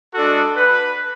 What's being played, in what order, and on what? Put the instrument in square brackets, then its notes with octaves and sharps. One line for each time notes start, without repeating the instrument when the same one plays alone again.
[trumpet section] G#3 D4 F#4 A4
B4